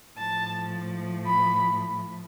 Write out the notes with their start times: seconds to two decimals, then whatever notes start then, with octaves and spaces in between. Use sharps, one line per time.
0.17 A2 F3 A5
1.26 B5